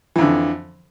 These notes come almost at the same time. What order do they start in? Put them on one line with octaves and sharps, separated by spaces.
E3 F2 D3